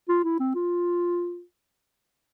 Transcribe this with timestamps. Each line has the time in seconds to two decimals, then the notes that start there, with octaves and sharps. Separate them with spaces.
0.09 F4
0.24 E4
0.40 C4
0.55 F4